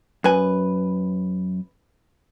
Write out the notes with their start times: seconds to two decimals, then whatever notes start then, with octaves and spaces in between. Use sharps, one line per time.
0.24 F#2 B4 G#5